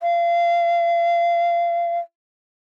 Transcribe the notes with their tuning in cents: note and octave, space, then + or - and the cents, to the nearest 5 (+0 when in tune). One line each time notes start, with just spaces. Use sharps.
F5 -30